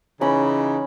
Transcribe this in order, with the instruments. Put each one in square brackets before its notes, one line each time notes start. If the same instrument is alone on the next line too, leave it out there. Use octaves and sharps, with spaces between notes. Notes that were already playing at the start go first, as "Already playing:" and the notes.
[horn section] C#3 E3 [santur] C#4 B5 [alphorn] D#4